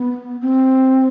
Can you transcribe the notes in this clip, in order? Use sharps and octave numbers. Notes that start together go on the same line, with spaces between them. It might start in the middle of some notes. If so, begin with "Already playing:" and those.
Already playing: B3
C4